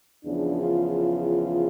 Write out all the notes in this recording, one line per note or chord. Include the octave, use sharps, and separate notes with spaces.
E2 C#3 F3 D4
F4